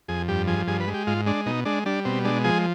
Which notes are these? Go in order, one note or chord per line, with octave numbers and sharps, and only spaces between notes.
F2 G#4
G2 G4
F3 G#4
G2 G#4
B4
G#3
G4
G#2 F4
G#3 D4
B2 D#4
G#3 D4
G3 D4
B2 C4
G#3 D4
F3 G#4